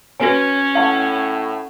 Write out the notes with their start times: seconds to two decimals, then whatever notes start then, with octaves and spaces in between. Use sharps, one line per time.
0.20 C#4 F#4 B4 C#5 G#5 A#6
0.75 A2 F5 F#5 A5 C#6